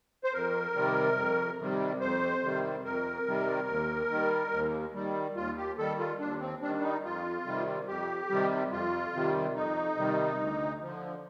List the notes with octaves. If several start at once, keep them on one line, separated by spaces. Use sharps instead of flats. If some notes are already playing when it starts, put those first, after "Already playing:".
C5
F2 A#4
C3 D#3 G3
F2
C3 D#3 G3
F2 C5
C3 D#3 G3
F2 A#4
C3 D#3 G3
D#2
D#3 G3
D#2
D#3 G3
D#2 F4
G4
D#3 G3 A4
F4
D#2 D4
C4
D#3 G3 D4
D4
D#4
F2 F4
C3 D#3 G3
F2 G4
C3 D#3 G3
F2 F4
C3 D#3 G3
F2 D#4
C3 D#3 G3
D2
D3 F3